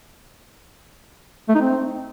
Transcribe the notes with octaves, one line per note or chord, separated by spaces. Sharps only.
A3
D#4
C4